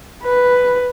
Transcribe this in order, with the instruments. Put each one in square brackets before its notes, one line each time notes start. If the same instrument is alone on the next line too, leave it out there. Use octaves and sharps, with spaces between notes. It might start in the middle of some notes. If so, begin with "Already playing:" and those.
[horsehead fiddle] B4